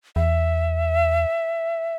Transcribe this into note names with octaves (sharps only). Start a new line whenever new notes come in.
E2 E5